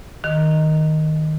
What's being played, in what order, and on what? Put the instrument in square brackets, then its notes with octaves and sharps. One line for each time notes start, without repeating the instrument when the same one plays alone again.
[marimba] D#3